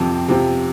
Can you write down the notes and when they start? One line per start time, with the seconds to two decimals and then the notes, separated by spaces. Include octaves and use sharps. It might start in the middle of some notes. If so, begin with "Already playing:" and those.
Already playing: F2 C3 F3 C4
0.28 C3 F3 C4